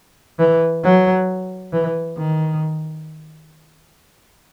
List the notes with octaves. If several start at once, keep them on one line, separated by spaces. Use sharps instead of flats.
E3
F#3
E3
D#3